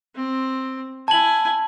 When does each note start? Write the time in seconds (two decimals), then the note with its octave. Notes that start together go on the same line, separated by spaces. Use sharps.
0.16 C4
1.08 E4 G#5 A5 F#7